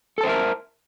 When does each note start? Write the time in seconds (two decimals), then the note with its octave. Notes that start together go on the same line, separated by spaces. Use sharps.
0.18 A4
0.21 A5
0.23 C5
0.26 E5
0.29 A#4